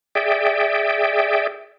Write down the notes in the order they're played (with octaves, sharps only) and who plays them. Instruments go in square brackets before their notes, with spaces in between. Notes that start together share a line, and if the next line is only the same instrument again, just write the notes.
[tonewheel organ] G#4 D5 E5 G5